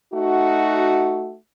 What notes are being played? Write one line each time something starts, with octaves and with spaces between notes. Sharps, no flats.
A3 D#4 F#4